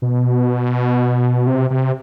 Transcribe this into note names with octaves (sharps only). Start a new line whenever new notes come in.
B2
C3
C3